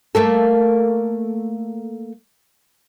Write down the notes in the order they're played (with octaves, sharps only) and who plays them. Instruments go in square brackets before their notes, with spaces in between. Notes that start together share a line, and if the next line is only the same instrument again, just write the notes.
[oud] A3 A#3 A4